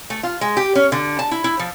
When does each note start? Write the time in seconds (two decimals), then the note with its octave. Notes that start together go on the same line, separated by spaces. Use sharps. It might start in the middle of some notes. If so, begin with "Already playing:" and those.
0.10 A3
0.23 F4
0.41 G#3
0.57 G4
0.75 C#4
0.92 D3
1.19 A5
1.31 E4
1.44 E4
1.59 F3